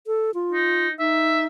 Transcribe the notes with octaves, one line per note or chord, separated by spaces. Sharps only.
A4
F4
D#4
D#4 E5